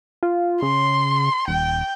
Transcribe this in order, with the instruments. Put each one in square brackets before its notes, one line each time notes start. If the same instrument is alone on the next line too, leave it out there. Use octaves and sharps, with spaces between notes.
[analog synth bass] F4
[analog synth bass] C#3 [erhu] C6
[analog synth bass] D#1 [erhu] G5